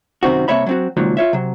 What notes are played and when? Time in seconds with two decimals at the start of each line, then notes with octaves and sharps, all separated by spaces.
0.23 F#2 C3 D#3 C4 F#4
0.48 C2 C3 A#3 C#5 E5 B5
0.66 F#3 C4 F#4
0.97 C#2 A#2 D#3 F3 F#3
1.17 F4 C#5 E5
1.33 C3 F#3